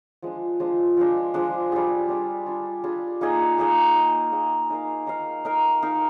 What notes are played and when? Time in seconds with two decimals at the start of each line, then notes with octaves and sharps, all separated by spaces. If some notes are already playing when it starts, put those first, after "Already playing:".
0.22 F3 G#3 D4
0.60 F3 G#3 D4
0.97 F3 G#3 D4
1.34 F3 G#3 D4
1.72 G3 D4 F4 G#4
2.09 G3 D4 F4 G#4
2.46 G3 D4 F4 G#4
2.84 G3 D4 F4 G#4
3.21 A#3 D#4 G#4 D#5
3.58 A#3 D#4 G#4 D#5
3.96 A#3 D#4 G#4 D#5
4.32 A#3 D#4 G#4 D#5
4.70 D#4 A#4 F5
5.07 D#4 A#4 F5
5.45 D#4 A#4 F5
5.82 D#4 A#4 F5